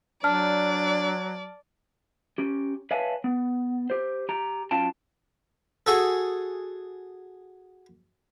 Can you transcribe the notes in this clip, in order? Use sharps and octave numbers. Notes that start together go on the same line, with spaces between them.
F#3 D4 D5 A5 F6
C#4 G4
B4 C#5 E5 F5 G#5 A5
B3
G4 C5
G4 A#5
F#3 C#4 F4 F5 G5 A5
F#4 G#4 A4